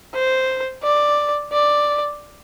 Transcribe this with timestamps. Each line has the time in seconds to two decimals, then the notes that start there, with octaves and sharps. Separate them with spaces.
0.14 C5
0.83 D5
1.52 D5